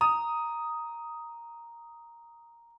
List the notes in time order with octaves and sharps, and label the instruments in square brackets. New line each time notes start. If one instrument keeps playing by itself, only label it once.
[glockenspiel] A#5 [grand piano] D#6